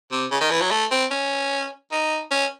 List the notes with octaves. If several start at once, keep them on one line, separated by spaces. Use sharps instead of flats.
C3
C#3
D#3
E3
F#3
A3
C4
C#4
D#4
C#4